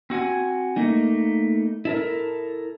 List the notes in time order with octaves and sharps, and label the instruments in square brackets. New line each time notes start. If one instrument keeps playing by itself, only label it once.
[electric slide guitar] C4 F#4 F#5 G#5
A3 A#3 D#4
E4 A4 A#4